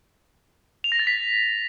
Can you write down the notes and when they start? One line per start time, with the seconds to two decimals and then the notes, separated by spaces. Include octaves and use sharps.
0.84 F7
0.92 A#6
0.99 A6
1.07 B6